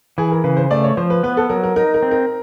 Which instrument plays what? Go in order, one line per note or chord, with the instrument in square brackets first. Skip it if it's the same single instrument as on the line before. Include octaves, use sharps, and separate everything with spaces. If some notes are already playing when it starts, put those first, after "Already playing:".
[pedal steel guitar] E3 [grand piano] G#4
[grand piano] A#4
[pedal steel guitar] C#3 [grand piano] B4
[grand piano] C5
[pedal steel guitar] A3 [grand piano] D5
[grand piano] C#5
[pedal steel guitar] F3 [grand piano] C5
[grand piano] B4
[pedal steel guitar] B3 [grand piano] B4
[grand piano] A4
[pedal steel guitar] F#3 [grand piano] A#4
[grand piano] A#4
[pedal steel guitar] D#4 [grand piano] A#4
[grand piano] A#4
[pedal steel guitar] C4
[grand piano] A#4